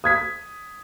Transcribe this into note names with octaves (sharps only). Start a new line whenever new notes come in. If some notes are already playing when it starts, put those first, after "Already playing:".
D#6 G#6 B6